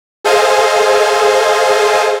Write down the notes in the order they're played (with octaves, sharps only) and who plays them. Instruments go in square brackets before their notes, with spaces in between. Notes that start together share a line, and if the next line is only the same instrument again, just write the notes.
[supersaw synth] G#4 A4 C5 D#5 F5 G#5